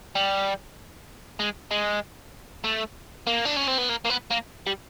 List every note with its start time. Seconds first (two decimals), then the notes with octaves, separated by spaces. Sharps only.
0.15 G3
1.40 G#3
1.71 G#3
2.64 A3
3.27 A#3
3.45 D4
3.56 C#4
3.68 C4
3.78 B3
3.89 A#3
4.05 A#3
4.10 B3
4.31 A#3
4.67 G3